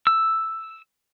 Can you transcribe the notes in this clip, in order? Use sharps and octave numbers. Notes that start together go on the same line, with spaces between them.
E6